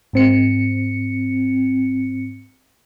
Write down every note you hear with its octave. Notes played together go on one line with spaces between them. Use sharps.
G#2 C4 C#7